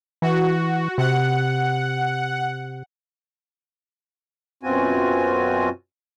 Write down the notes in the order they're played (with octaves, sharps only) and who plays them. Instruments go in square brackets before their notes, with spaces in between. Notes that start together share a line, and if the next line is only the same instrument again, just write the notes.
[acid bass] E3 [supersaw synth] F#4
[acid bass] C3 [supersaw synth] F#5
[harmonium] F#2 B2 C4 F4 F#4 G#5